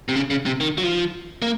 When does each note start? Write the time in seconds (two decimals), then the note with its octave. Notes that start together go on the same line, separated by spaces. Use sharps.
0.09 C3
0.15 C#3
0.30 C#3
0.46 C3
0.60 D#3
0.78 F#3
0.83 F3
1.42 A#3